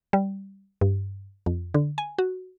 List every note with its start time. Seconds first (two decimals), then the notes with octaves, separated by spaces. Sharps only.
0.13 G3
0.81 G2
1.46 F2
1.74 D3
1.98 G#5
2.18 F#4